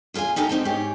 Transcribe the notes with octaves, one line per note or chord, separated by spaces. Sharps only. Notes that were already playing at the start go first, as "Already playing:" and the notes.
E2 F4 G#4 F5 G#5
C#4 D#4 G4 A4 A5 A#5
G#3 C4 D#4 G4
G#2 G4 G#4 C#5